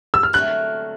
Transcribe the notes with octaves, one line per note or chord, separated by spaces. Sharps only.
E6
F6
D3 F#3 A3 C4 F#6